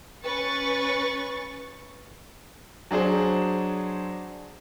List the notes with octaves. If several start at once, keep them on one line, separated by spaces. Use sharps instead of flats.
C#4 B4 C#6 A6
F#3 D4 G#4 C5